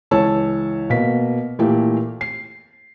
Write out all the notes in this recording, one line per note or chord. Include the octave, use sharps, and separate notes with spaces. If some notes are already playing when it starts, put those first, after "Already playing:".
C#2 E3 C#5 A5 E6
B2 A#3 B6
A#2 E3 A3 A#3 G4
C7